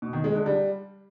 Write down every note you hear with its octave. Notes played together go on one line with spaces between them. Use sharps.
B2
D#3
G#3
D3
G3